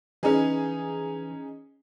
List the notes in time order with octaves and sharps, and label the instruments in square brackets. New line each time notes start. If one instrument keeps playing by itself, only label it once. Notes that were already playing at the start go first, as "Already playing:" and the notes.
[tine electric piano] E3 [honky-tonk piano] C#4 D#4 G#4